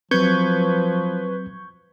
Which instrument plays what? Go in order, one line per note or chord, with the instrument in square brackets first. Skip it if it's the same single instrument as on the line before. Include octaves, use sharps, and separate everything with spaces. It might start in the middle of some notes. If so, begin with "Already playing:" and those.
[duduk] F3 [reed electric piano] F#3 C4 [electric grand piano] B4 [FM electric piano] C#6 G6 G#6